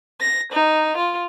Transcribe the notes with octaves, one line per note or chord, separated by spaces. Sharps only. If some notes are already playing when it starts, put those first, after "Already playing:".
A#6
D#4
F4